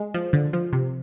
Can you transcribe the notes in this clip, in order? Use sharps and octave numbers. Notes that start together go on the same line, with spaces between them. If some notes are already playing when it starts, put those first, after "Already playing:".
Already playing: G#3
F3
D3
F3
C3